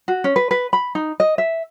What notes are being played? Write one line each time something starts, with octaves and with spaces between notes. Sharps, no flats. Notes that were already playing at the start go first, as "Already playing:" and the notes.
F#4
C#4
B4
B4
B5
D#4
D#5
E5